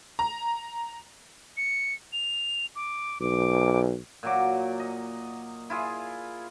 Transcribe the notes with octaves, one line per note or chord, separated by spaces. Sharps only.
A#5
C#7
F7
D6
B1 D6
A#2 F#3 D6
D#5
E4 F4 G#4